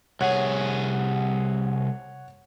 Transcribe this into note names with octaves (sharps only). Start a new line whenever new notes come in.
C2 G#4 C#5 F#5